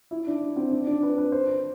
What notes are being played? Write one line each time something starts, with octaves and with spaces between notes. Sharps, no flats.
E4
D4
C4
D4
D4
B4
B4
C5